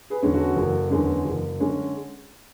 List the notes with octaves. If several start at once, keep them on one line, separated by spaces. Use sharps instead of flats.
G#4 B4
E2 D3 G#3 C#4
F#4 A4
F#1
E2 D3 G#3 C#4
F#1
D3 G#3 C#4